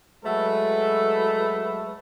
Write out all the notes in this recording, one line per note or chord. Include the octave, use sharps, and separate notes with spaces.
F#3 G#3 A3 F#4 A4 B4